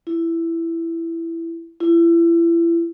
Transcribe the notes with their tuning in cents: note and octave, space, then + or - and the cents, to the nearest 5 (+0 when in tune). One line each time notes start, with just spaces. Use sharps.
E4 +10
E4 +35